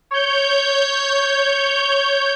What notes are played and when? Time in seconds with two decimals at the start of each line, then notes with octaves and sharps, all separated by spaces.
0.11 C#5 G6